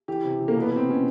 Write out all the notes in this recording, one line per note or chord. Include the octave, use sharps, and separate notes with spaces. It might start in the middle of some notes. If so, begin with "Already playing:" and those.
E3 G4
C3
E3
A#3
B2
B3
B2 C4
B2 C#4